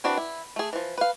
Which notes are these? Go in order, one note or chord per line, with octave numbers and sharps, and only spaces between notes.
E3 C4 D4 F#4 B4
E4
A3 G#4
E3 F3
B4 F5